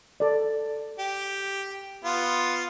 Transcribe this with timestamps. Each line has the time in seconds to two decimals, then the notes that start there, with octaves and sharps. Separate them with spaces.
0.20 A4 D5
0.99 G4
2.04 B3 F4